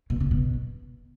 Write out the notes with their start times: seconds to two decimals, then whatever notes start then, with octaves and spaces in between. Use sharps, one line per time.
0.10 B2
0.20 C#3
0.31 B2